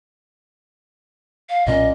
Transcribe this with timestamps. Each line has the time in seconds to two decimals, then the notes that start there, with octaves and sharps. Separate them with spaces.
1.49 F5
1.67 B1 A#2 C#4 D#5